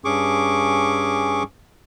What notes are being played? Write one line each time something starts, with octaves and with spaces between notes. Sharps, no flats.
G2 C#4 G#4 C#6 D6